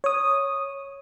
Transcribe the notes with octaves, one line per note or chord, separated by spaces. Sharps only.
C#5 D#6